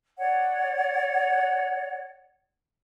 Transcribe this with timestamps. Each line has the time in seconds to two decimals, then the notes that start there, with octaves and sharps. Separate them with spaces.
0.19 C#5 D5 F#5